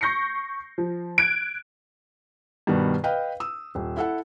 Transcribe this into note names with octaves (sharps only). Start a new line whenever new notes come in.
C#6 G6 A#6 C7 C#7
F3
F#6 G#6 D7
G2 B2 D#3 B3
B4 D#5 F5 G5
D#6 E6
D#1
E4 A4 F#5